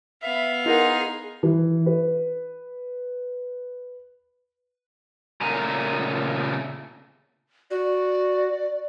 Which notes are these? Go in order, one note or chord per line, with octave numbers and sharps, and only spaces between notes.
B3 E5 F5
D#4 E4 G#4 A#4 F#5 C6
E3
B4
A#2 C#3 A3 A#3 G#5 A#5
F#4 D5